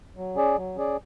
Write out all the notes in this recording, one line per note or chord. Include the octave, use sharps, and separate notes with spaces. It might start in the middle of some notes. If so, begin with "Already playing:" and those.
F#3
C#4 G#4 D5
F#3
C#4 G#4 D5